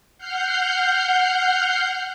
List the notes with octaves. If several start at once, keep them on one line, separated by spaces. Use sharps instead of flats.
F#5 F6 G6 C7